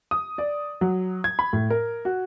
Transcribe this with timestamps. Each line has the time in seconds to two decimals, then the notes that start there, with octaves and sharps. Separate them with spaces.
0.11 D#6
0.38 D5
0.81 F#3
1.24 G#6
1.39 B5
1.53 A2
1.70 A#4
2.05 F#4